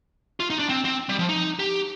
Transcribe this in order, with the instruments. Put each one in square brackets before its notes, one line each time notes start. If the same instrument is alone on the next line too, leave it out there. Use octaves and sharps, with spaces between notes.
[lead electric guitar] F4
D#4
D4
C4
C4
G3
F3
D#4
G4